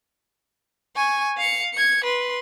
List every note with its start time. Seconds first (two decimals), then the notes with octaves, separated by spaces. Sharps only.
0.96 G#5 C#6
1.38 F5 C#7
1.74 G#6 C#7
2.04 B4 C6